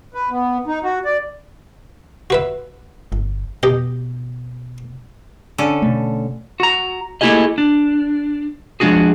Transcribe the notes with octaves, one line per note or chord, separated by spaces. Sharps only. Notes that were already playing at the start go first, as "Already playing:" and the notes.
B4
B3
D#4
F#4
D5
F#4 B4 E5
G1
B2 G4 D#5
D3 C#4 A4
B2 A3
F#4 A#5
A3 A#3 E4 G4 G#4 D#5
D4
F3 G#3 D4 F#4 G#4